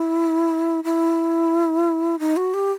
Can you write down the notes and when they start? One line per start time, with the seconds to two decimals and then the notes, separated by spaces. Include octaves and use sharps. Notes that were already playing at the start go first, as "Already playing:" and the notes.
Already playing: E4
0.84 E4
2.19 D#4
2.36 F#4
2.54 G4